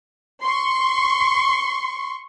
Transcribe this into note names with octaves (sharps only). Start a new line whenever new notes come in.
C6 C#6